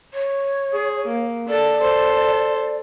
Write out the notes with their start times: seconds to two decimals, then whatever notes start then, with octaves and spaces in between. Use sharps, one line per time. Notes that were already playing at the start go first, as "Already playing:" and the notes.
0.13 C#5
0.72 G#4
1.06 A#3
1.48 A4 D5
1.80 A4 C5